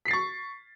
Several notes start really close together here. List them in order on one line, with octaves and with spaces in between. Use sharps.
B6 C7 A6 C#6